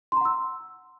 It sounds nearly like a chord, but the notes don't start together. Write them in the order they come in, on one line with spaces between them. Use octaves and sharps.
C6 A#5 F#5 E6